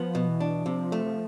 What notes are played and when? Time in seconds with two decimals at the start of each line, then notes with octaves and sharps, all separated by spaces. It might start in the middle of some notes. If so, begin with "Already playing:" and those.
Already playing: F3 B3
0.15 B2
0.28 E3
0.40 D4
0.66 C3 F3
0.92 A3
1.06 F3